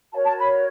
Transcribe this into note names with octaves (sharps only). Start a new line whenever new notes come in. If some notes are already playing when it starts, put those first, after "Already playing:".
F#4 A#4 C#5 A5
A5
B5